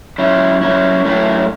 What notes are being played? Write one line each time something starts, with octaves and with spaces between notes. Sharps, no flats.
F#3 C#4 E4
F#3 C#4 E4
A2 F#3 C#4 E4